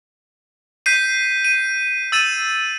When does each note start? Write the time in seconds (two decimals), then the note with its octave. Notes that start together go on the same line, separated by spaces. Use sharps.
0.86 G6 B6 C7 D#7
1.45 D#7
2.12 E6 A6 D#7 E7